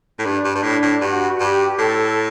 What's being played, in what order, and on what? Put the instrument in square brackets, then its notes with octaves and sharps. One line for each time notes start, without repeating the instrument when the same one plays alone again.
[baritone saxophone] A2
[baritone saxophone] G2 [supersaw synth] D4
[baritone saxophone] G2
G2
A2
A2
[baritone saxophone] G2 [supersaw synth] F#4
[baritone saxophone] G2 [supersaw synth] G4
[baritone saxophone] A2 [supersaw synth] A4